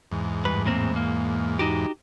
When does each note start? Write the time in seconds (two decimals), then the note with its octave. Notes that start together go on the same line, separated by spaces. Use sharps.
0.12 E2 G#2
0.45 G2 B4
0.65 A2 A#3 C4
0.96 A#3
1.59 D#4 F#4 G4